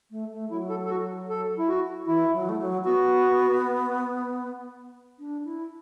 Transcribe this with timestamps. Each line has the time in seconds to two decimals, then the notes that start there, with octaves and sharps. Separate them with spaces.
0.11 A3
0.32 A3
0.50 F#3 E4
0.70 A4
0.85 A4
0.90 F#4
1.29 A4
1.59 E4
1.68 F#4
2.07 E3 E4
2.33 F#3
2.49 A3
2.59 F#3
2.85 B3 F#4
5.19 D4
5.45 E4